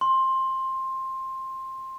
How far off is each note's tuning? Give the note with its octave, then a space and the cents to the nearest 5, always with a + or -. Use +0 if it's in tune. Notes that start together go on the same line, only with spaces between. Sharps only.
C6 +15